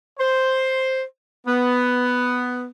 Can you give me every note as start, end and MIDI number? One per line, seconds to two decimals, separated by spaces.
0.19 1.02 72
1.47 2.65 59